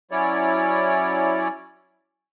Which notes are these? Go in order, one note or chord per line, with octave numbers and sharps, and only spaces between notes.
F#3 C#4 E4 C#5 D5